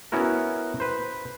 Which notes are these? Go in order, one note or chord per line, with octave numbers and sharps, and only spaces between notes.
B3 C#4 E4 F#4 A#4
B4 C5